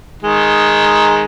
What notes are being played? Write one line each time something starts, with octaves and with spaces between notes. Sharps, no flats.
D#3 G#3